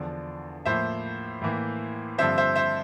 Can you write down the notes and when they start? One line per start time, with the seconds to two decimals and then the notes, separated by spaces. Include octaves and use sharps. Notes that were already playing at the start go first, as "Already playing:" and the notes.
Already playing: E2 D3 F3 D5
0.66 A2 F3 A#3 C5 E5
1.42 A2 E3 A#3
2.18 G2 D3 F3 C4 C5 E5
2.38 C5 E5
2.56 C5 E5